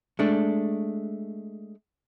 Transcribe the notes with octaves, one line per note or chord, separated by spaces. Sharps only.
G#3 A3 D4